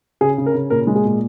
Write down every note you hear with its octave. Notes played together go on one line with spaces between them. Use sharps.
C#3 G#4
C#3
A#4
C#3
A#2 A#4
G#3
G#4
A#2